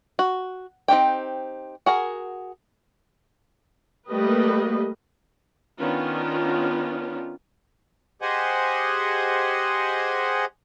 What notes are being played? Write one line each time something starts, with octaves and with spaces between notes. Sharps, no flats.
F#4
C4 D#4 G4 G5
F#4 G#4 A#4
G3 A3 A#3 G4 B4 D#5
D#3 B3 C#4 D4 F4
G4 G#4 C5 D#5 F#5 G#5